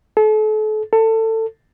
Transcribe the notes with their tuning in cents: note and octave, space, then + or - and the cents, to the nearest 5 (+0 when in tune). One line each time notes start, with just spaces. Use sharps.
A4 -35
A4 +25